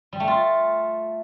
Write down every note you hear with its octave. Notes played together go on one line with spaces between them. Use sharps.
G3
A3
F4